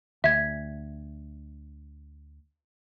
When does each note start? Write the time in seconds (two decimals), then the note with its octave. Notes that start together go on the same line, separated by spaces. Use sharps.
0.24 D2 E5 G#6